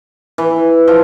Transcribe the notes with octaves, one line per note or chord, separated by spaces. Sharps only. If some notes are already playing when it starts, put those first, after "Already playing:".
E3
F3